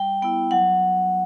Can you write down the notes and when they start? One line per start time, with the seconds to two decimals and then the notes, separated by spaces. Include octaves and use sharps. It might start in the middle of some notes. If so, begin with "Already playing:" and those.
Already playing: G3 G5
0.22 B3 E4 G5
0.51 F#3 F#5